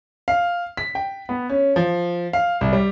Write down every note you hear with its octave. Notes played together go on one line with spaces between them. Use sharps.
F5
B6
G5
B3
C#4
F3
F5
C2
G3